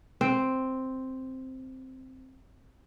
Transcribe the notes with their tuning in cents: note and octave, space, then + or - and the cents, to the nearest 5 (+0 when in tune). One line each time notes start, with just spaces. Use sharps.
C4 +0